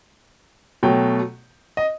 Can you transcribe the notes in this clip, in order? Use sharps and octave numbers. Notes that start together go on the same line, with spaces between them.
B2 F#3 A3 G5
D#5